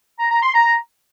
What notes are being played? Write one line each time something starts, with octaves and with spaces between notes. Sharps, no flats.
A#5
A#5
C6
A#5